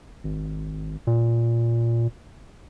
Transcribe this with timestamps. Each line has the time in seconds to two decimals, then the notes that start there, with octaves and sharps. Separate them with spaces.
0.24 G#1
1.07 A#2